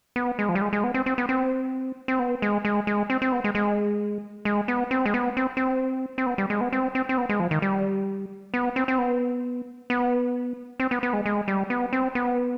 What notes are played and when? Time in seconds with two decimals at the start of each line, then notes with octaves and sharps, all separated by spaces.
0.16 B3
0.39 G#3
0.49 F3
0.55 G3
0.61 G#3
0.73 G#3
0.84 B3
0.94 C4
1.06 C4
1.18 B3
1.29 C4
2.08 C4
2.19 B3
2.42 G#3
2.65 G#3
2.87 G#3
3.10 C4
3.22 C4
3.32 B3
3.44 G#3
3.55 G#3
4.45 G#3
4.68 B3
4.91 C4
5.06 G#3
5.14 B3
5.37 C4
5.57 C4
6.18 C4
6.26 B3
6.38 G3
6.50 G#3
6.61 B3
6.73 C4
6.95 C4
7.09 C4
7.18 B3
7.29 G#3
7.40 F3
7.51 D#3
7.62 G3
8.54 B3
8.76 C4
8.88 C4
8.98 B3
9.90 B3
10.80 C4
10.91 B3
11.03 B3
11.13 G#3
11.26 G#3
11.48 G3
11.70 B3
11.93 C4
12.15 B3